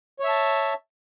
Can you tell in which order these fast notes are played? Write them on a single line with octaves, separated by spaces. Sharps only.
C#5 E5 A5